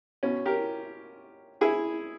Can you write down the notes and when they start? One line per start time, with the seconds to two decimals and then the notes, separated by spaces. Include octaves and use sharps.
0.23 B2 C#4
0.46 G4 A#4
1.61 E4 G#4